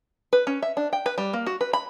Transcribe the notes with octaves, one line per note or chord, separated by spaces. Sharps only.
B4
C#4
E5
D4
G5
B4
G3
A#3
F#4
B4
B5